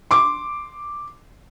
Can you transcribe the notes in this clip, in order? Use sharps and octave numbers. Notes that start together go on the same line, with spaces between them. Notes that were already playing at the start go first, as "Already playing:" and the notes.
C6 D6